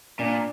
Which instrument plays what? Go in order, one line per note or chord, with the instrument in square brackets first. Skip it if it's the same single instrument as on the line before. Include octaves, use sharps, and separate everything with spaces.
[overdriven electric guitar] A#2 [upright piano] D4